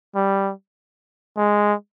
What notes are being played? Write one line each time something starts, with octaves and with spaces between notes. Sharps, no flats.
G3
G#3